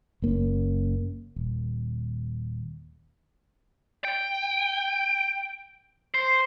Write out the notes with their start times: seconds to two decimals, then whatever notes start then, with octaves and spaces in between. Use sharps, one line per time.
0.22 F#1 A#3 C4 C#4
1.36 D#1
4.05 G5
6.14 C5